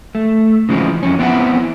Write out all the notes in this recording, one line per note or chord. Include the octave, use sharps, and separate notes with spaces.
A3
C#3 E3 F3 G#3 C4
F2 C#4
B3 C4 E4 F#5